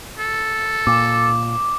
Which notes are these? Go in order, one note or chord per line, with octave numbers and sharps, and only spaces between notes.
A4
A#2 D6